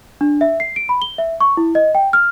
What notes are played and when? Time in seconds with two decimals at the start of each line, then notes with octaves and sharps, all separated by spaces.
0.21 D4
0.41 E5
0.60 C7
0.76 D7
0.89 B5
1.02 G7
1.18 E5
1.41 C#6
1.57 E4
1.75 D#5
1.95 G5
2.13 F6